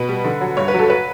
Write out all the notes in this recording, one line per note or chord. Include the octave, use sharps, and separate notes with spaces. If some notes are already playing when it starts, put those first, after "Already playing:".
Already playing: B2 B4
G3
D3
F#3
G2 C#5
B4
F#3 A4
B4